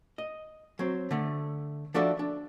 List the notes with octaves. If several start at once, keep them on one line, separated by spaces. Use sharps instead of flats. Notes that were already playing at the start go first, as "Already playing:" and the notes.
D#5
F#3 C4
D3 A3
F3 D4 F#4 A4 D5 E5
D4